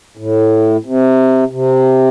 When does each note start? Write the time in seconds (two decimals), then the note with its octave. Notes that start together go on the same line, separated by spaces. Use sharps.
0.17 A2
0.85 C3
1.51 C3